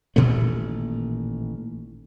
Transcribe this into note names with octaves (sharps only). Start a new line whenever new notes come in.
A1 A#2 D#3 A3